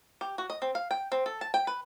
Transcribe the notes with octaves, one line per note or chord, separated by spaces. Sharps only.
G4
F#4
D#5
C4
F5
G5
C4
A4
A5
G5
B4